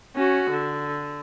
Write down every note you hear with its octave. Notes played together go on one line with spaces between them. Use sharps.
C#4 F#4
D3